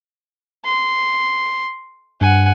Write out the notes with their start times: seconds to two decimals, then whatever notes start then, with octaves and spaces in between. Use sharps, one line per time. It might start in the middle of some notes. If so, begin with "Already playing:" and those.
0.65 C6
2.21 G2 F#5 G#5